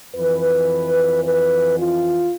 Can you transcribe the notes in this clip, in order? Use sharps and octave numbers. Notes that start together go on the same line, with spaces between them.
F2 E3 B4
B4
F4